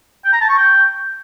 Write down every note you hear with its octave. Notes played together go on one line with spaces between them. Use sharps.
G5
A#5
A5
C#6
G5